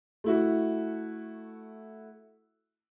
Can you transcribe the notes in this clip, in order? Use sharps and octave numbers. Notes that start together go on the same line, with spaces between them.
A3 E4 F#4